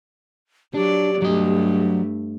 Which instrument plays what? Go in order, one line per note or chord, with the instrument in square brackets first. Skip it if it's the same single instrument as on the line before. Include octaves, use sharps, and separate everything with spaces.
[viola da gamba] F#3 D5 [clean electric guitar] D4 [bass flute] G4
[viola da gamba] G2 A3 [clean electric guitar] F#3 D#5